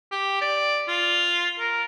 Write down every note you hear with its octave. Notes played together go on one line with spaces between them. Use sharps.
G4
D5
F4
A#4